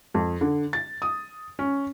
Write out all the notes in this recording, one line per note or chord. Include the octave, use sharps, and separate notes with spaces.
F2
D3
A6
D#6
C#4